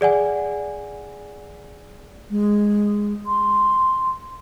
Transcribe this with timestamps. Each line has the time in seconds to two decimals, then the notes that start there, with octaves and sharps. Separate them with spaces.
0.01 G#4 D5 F#5 G#5
2.30 G#3
3.27 C6